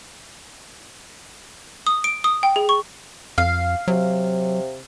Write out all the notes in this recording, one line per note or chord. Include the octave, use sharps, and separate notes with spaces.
D#6
D7
D#6
G5
G#4
C#6
F2 F5
C3 F#3